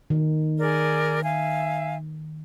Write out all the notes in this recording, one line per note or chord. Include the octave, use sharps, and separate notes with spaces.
D#3
G#4 A#4 D5
E5 F5 G#5